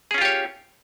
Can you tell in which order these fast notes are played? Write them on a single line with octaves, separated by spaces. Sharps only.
G#4 C#4 F4 G4 C#5